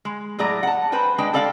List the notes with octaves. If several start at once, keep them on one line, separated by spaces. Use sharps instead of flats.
G#3
A2 F#3 G#4 D5 A#5
F#5 A5
B4 C5 G5 G#5
G#3 D4 G5
G4 A4 D5 F5 G5